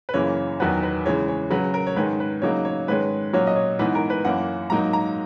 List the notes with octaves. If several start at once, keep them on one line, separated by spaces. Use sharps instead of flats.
B4
F#2 C#3 E3 A#3 C#5
E2 D#3 F#3 B3 D#4 B4
B4
C#3 E3 G#3 C#5
C#5
C#3 F#3 C#4 B4
A#4
C#5
G#2 D#3 G#3 C#4 B4
B4
C#3 F#3 A#3 D#4 C#5
C#5
G#2 D#3 G#3 C#4 B4
A#2 F#3 C#4 C#5
D#5
C#5
G#2 E3 B3 D#4 B4
A#4
B4
F#2 E3 A#3 C#4 F#5
G#2 F#3 A#3 D#4 A#5
A#5